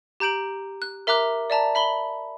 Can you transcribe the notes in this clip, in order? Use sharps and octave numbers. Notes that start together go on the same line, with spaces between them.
G4 A#5 G6 D7 F#7
F#6
A#4 E5 A#5 D6 F#6
D5 E5 A5 A#5
E5 B5 F#7 G7